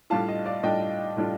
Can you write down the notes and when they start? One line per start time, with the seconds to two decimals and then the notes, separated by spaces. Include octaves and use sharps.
0.10 A2 G3 D4 F4 F5 A5
0.29 D#5
0.46 D5 F5
0.63 A2 G3 D4 F4 D#5 G5
1.16 A2 G3 D4 F4